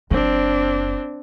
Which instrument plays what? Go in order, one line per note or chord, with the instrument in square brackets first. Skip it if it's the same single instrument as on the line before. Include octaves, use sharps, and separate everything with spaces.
[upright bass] F#1 [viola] C4 D4